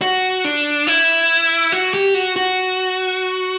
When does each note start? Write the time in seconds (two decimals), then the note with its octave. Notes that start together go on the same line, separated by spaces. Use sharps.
0.02 F#4
0.44 D4
0.87 E4
1.72 F#4
1.94 G4
2.14 F#4
2.36 F#4